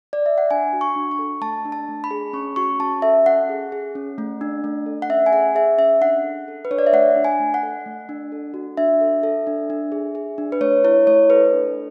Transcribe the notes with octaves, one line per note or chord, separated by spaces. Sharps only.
D5
E5
F#5
D4 G#5
F#4
C#6
D4
C#6
A4
A3 A5
D4
A5
A3
B5
G#4
C#4 C#6
F#4 C#6
C#4 A5
A4 E5
C#4 F#5
G#4
G#4
C#4
A3
D4
A3
A4
F#5
C#4 E5
G#5
G#4 F#5
G#4 E5
C#4 E5
D4 F#5
A4
A4
B4
D4 C#5
D5
E5
A3 F#5
D4
G#5
A3
F#5
A4
A3
D4
A4
F#4
D4 E5
A4
A4
D4
D4
G#4
G#4
D4
B4
A3 C#5
E4 C#5
A3 C#5
A4 B4
D4